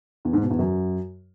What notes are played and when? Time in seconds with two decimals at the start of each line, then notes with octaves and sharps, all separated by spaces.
0.25 E2
0.33 G#2
0.42 B2
0.50 E2
0.59 F#2